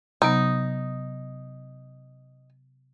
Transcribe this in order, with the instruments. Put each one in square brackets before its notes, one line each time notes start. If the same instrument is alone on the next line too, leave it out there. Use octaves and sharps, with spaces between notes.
[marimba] C3 F#3 B3 [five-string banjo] D#4